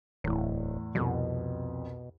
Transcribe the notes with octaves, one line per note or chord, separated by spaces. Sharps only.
D1 E2 A2
C2 F2 B2